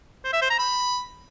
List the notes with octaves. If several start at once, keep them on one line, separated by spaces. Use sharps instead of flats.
C5
E5
C5
A#5
B5